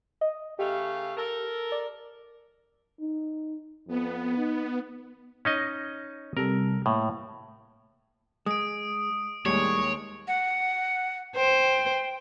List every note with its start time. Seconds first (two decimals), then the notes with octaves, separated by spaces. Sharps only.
0.21 D#5
0.59 C#3 A3 G4 F5
1.17 A4 A#4
1.72 D5
3.00 D#4
3.88 F2 B3
4.37 D#4
5.45 C#4 D#4 D#5
6.37 C3 G3 A4 A#4
6.86 A2 A#3
8.46 G#3 D#6 D7
9.46 D#2 A2 G3 G#3 C#5
10.28 F#5
11.36 C5 G5